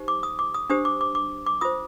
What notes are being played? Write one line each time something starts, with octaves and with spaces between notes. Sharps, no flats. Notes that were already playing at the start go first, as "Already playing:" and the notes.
Already playing: D#4 G4 C5
D6
D#6
D6
D#6
D4 G4 C5 D#6
D6
D6
D6
D6
F4 C5 D#6